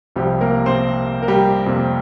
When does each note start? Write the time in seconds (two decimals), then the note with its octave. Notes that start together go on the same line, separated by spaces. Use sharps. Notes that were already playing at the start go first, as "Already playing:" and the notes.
0.16 C2 C3 F3 G3 G4
0.41 A#3 A#4
0.66 C4 C5
1.23 A#4
1.28 G3 G4
1.66 F2 C3 A#3